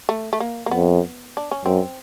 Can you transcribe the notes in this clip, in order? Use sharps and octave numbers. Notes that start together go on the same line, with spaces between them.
A3
A3
A#3
A#3
F2 B3
D4
C#4
F#2 C4